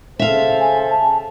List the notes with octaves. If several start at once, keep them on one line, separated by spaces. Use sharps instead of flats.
C#3 A4 C5 E5 F5
G#5
A5